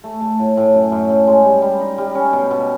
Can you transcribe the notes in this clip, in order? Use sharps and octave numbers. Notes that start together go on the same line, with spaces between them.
A3
A3
A2
A2
F#2
F#2
F#2
G#3
G3
G3
D#4
G3
C#4
B2
B2